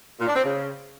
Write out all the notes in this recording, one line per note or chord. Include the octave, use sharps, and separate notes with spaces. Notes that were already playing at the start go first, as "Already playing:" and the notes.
A#2
D4
C4
C#3